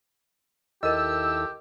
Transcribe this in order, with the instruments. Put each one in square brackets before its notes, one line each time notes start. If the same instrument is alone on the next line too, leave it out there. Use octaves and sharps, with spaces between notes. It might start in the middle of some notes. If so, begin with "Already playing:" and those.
[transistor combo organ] D#2 E4 A4 [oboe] G4 [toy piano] A#4 D#5 [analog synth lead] E6